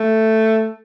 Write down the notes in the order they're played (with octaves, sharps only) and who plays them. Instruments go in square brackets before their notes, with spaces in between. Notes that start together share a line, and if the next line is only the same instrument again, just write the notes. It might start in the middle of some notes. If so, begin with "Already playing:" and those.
Already playing: [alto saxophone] A3